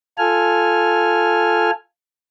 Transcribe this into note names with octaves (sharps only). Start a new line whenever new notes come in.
F4 A4 G#5 F6